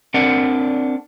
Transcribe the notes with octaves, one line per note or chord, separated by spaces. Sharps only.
C4 D4 A#4 D5 F#5